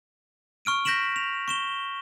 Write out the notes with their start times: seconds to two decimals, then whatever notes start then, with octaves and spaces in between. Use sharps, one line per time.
0.65 C#6 F6 D7 D#7
0.85 G6 A#6 B6 D7 E7 F#7
1.16 F7
1.48 C#6 E7 G7